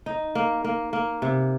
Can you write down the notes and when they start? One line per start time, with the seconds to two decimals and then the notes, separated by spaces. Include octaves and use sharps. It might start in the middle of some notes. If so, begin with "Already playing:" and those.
0.06 D#4
0.35 A#3
0.64 A#3
0.93 A#3
1.22 C3